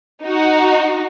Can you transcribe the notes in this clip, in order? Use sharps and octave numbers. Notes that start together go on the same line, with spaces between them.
D#4 F#4